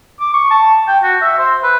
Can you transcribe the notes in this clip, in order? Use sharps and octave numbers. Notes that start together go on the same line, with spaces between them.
D6
C#6
A5
G5
F#4
E5
C5
B4